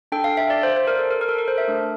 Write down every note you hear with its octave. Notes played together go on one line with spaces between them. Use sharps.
D4 A4 G5
F5
E5
D5
C5
C5
A#4
A4
A#4
A#4
A4
A#4
C5
E5
A3 D4 A4